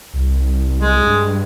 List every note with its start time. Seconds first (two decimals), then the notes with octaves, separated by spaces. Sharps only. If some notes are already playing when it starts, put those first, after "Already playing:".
0.14 C2
0.80 G#3
1.01 G2